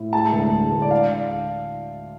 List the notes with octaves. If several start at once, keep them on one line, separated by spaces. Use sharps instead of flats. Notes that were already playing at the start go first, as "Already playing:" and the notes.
Already playing: A2
G#3 A5
D2
G#3
D2
D5
F5